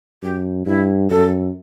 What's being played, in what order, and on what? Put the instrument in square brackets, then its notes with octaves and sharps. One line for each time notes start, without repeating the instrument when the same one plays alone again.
[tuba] F#2 [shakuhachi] G4
[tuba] G2 [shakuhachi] E4
[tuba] F#2 [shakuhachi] A4